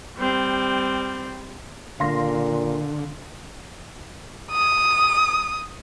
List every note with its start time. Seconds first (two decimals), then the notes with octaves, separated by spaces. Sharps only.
0.18 G3 C4
2.00 A#2 D3 F5 C6 A#6
4.51 D#6